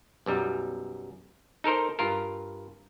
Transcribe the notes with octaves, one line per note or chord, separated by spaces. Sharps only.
B1 F#2 G3
D#4 A4 A#4 C5
G2 F4 A#4